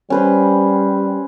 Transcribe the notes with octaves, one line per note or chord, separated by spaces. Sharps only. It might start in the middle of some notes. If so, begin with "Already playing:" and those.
G3 C#4 B4 C5